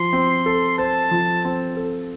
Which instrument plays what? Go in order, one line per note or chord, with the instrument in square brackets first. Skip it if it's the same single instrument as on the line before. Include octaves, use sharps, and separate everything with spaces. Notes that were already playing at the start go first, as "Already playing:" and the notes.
Already playing: [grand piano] F3 [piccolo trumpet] C6
[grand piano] C4
A4
[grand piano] C5 [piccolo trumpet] A5
[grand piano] F3
C4
A4